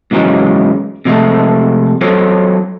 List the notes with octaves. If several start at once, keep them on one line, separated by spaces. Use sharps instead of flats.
G#2 C#3 E3 F#3 G#3
C3 F3 G#3 A3
F#3 F4 A4 C5 C#5